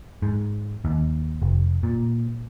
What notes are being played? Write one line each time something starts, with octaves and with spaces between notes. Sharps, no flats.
G#2
D#2
F1
A#2